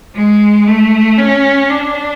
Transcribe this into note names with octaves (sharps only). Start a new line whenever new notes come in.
G#3
A3
C#4
D4